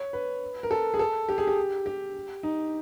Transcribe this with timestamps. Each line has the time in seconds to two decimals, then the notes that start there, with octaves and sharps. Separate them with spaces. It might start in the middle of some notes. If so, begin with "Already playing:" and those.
Already playing: C#5
0.13 B4
0.63 A#4
0.71 A4
0.94 G#4
0.99 A4
1.29 G4
1.38 G#4
1.47 G4
1.86 G4
2.43 D#4